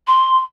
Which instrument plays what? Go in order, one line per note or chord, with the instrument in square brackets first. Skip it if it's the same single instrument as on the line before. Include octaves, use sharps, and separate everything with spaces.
[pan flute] C6